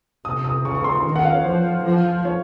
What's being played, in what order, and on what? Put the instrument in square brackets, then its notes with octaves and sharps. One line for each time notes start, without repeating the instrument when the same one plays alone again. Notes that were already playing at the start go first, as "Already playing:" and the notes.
[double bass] C3 [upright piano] D#6
[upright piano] D#6
[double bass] C#3 [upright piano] C#6
[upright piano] C#6
C6
C6
[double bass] D#3
[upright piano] F#5
F5
C#5
[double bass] F3 [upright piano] C5
[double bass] F3
[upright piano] C#5